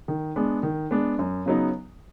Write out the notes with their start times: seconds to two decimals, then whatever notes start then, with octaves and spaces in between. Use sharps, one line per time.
0.08 D#3
0.36 G#3 B3 D4
0.63 D#3
0.91 G#3 B3 D4
1.19 F#2
1.46 C#3 F#3 B3 D#4